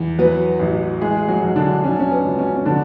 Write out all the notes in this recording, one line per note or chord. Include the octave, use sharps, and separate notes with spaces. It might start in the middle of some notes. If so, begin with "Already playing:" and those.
Already playing: E2
F#3 B3 B4
A1
E3 G#3 G#4
F#3 F#4
B1
D3 D4
F#3 C#4
D4
C#4
B3
C#2
C#4
C#4
D3 F#3 D4